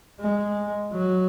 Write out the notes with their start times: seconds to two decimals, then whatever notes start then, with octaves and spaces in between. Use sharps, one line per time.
0.20 G#3
0.92 F#3